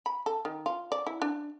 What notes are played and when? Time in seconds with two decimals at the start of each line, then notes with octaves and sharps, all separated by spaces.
0.06 B5
0.26 A4
0.45 D#3
0.66 F4
0.92 D5
1.07 E4
1.22 D4